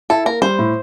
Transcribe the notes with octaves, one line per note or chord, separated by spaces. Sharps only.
E4 A4
A#3 A#4
G3 C5
A2